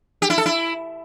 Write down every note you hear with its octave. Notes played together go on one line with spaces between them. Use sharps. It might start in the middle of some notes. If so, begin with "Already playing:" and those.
G4
E4
A4
E4